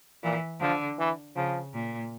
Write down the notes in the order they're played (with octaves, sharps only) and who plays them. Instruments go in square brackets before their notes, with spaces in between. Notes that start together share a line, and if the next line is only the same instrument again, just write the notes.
[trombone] A#2 [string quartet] E3
[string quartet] D3 [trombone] F3
[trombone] E3
[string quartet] C#3 [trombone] F3
[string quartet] A#2